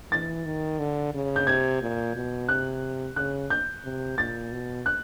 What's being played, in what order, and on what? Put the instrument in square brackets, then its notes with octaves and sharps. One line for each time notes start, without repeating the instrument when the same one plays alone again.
[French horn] E3 [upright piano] A6
[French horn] D#3
D3
C#3
[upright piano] G6
[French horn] C3 [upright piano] G#6
[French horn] A#2
B2
[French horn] C3 [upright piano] F#6
[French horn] C#3 [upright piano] F#6
[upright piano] G6
[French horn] C3
[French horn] A#2 [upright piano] A6
[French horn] B2
[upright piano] F#6